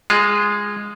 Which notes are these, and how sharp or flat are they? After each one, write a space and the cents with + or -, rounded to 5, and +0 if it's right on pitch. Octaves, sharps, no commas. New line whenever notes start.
G#3 -10 F4 +0